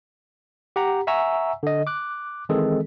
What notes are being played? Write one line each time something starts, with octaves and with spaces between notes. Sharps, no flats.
G4 F#5 A#5
E5 F#5 G#5 A#5 C#6 E6
D3 D#5
D6 F#6
D#3 E3 G#3 C4 G#4 A4